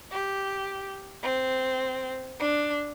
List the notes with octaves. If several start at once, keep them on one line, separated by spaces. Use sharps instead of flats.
G4
C4
D4